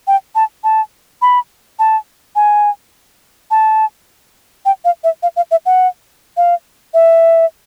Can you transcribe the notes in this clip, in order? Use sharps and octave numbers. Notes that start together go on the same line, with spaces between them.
G5
A5
A5
B5
A5
G#5
A5
G5
F5
E5
F5
F5
E5
F#5
F5
E5